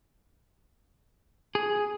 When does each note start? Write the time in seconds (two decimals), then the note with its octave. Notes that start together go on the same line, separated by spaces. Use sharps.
1.55 G#4